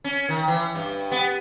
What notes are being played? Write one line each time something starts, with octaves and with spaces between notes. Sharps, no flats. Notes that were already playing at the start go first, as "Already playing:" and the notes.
C#4
D#3
E3
G2
B3